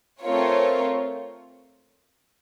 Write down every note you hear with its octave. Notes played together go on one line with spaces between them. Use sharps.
A3 C4 F4 A#4 C#5